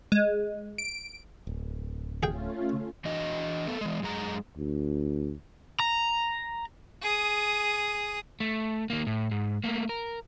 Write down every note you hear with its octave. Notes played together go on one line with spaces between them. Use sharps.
G#3
D7
D1
A3 C#4 F4 G#4 G5
E3 D4 F#4 D#5
A3 B3 A4
E3 G#3
F#2 G#3 A#5
D2
A#5
G#4 D#6
A3
D#3 A#3
A2
G#2
A3 A#3
A#4